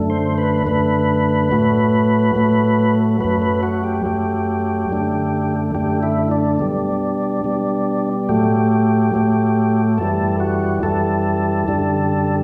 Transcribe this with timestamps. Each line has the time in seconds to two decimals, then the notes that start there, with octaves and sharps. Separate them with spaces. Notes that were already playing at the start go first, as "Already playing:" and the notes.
Already playing: F#2 D3 A3
0.10 C5
0.38 B4
0.66 F#2 D3 A3 B4
1.51 A2 F#3 A3
2.36 A2 F#3 A3
3.20 F#2 F#3 A3 B4
3.42 B4
3.63 F#4
3.84 G4
4.05 F#2 F#3 A3
4.90 F#2 D3 A3
5.75 F#2 D3 A3 G4
6.03 E4
6.31 D4
6.59 B2 G3
7.44 B2 G3
8.29 A2 F#3 A3 G4
9.14 A2 F#3 A3
9.98 F#2 E3 G3 A4
10.40 F#4
10.83 F#2 E3 G3 A4
11.68 F#2 D3 G3